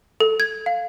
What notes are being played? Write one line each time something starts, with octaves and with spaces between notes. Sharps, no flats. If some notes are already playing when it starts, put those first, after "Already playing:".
A4
G#6
F5